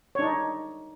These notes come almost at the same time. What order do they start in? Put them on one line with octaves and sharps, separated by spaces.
C#5 D4 D#4